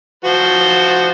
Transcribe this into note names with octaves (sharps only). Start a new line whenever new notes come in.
F3 F#4 C5